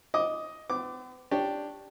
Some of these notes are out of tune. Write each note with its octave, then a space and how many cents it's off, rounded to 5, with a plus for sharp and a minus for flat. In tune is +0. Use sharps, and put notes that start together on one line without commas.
D#5 +10 D6 +0
B3 +45 D6 +0
D4 +0 G4 +0 C#5 +0